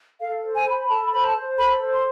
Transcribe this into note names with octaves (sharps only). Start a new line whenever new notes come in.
A4 F5
C5
G#5
B5
A4 A5
C5 B5
A5
C5
A4 B5
C5
C6